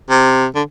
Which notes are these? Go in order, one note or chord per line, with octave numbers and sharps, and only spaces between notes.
C3
D3